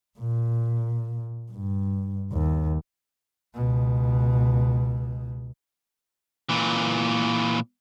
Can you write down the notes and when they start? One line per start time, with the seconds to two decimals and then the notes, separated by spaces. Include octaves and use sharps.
0.19 A#2
1.52 G2
2.32 D#2
3.54 C#2 B2
6.49 A#2 E3